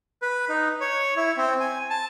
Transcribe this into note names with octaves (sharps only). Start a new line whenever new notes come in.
B4
D#4
C#5
E4
C4
G#5
A5